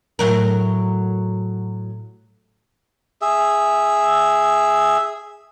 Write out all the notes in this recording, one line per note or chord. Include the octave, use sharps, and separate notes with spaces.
A2 F#3 A#4
G#4 E5